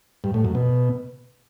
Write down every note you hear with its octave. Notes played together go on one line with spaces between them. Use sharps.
G2
A2
F#2
B2